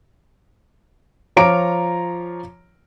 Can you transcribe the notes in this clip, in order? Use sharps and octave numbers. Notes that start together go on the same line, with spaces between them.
F3 F4 C#5 A#5 D6 D7